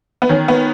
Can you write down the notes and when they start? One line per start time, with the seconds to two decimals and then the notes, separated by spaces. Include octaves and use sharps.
0.22 B3
0.29 D#3 C#4
0.48 B3